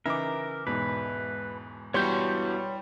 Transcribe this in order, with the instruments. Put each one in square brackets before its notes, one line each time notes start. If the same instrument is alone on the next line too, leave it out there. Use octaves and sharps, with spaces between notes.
[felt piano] C#3 E3 D#4 [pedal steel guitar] A#4 [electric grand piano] E5 D6
[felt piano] E1 G#2 B2 [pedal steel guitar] B4
[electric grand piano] G3 G6 [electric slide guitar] B3 E4 F#4 [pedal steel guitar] C#5 C6 C#6